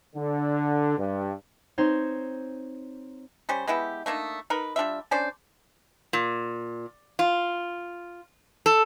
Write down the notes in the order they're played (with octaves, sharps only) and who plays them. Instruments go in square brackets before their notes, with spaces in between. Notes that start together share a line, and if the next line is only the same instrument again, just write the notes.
[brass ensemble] D3
G2
[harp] C4 D#4 C5 C#5
[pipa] G3 C#4 C5
G#3 B3 E4 G4
A3 A#3 D4 D#4
D#4 A#4 B4
G3 D4 F4 E5
C#4 D4 C5 D5
[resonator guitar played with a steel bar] A#2
F4
A4